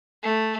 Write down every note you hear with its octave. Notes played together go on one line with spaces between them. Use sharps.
A3